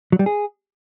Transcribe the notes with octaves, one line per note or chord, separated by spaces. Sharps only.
F#3
G3
G#4